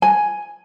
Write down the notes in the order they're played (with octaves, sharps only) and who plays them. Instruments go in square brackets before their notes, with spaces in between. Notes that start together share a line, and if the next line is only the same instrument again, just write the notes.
[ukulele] G#5